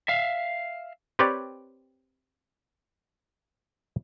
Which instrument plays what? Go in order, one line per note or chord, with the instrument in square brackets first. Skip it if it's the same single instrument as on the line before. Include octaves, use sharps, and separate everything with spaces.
[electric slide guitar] E5 F5
[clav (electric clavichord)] C4 G4 B4 C#5 D5 G5